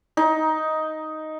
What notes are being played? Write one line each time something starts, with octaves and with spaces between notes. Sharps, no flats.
D#4